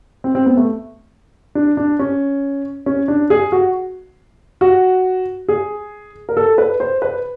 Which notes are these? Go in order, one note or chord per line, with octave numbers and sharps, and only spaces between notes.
C4
C4
B3
A3
D4
D4
C#4
C#4
D4
G#4
F#4
F#4
G#4
A#4
A4
B4
C5
B4